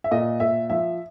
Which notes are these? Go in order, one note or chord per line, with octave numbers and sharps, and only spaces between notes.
E5
A#2 D#5
A#2 E5
F3 E5